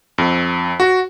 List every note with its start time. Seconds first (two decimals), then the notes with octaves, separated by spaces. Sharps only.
0.18 F2
0.80 F#4